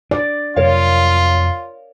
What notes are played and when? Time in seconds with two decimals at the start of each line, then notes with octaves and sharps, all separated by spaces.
0.11 D4 D5
0.56 F2 C3 F#3 F4 A#4 C#5 F5